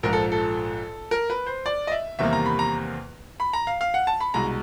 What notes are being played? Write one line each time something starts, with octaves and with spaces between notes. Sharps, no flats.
A#1 G#2 F3 A#4
A4
A4
A#4
B4
C5
D5
D#5
E5
E2 C3 D#3 G3 A#3 E5
A#5
B5
A#5
B5
A#5
F5
F5
F#5
A5
B5
C2 B2 G#3 A#5